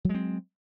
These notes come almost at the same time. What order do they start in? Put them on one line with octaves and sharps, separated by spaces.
F#3 G#3 C4